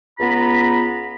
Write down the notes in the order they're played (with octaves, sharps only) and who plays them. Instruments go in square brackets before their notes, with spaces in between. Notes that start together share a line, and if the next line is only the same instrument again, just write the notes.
[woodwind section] C#2 B3 F4 A#5 B5